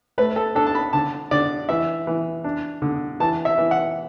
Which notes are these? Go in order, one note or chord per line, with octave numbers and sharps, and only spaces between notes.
A3 B4
A4
D4 A4
A5
B5
D3 A5
D3 D5
E3 E5
E3
D4
D3
E3 A5
E5
E3
F#5